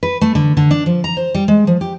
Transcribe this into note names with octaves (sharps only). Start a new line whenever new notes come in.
B4
A3
D3
D3
D4
F3
A#5
C5
G3
G#3
F3
G4